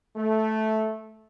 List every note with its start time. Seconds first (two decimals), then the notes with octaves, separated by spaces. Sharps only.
0.17 A3